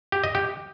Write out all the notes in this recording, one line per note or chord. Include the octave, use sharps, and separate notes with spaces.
G4
D#5
G4